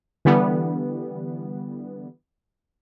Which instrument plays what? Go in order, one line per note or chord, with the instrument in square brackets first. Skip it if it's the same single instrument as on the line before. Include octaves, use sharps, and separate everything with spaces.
[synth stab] D3 E3 G3 B3